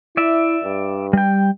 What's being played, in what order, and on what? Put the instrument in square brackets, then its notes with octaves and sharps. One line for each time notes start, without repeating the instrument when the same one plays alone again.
[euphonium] E4 [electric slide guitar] D5 E5
[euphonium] G2
[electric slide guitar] G3 G5